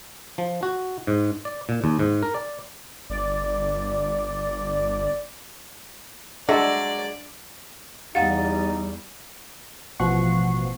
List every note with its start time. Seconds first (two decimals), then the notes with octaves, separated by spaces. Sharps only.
0.38 F3
0.63 F#4
1.07 G#2
1.45 D5
1.69 A#2
1.84 D#2
1.99 G#2
2.23 A#4
2.35 D5
3.10 G1 D5
6.49 F#3 G#3 D4 A4 D5 E5
8.15 E2 G3 D#4 G4 F5 F#5 A6
9.99 A1 B2 F3 F#5 C#6 C7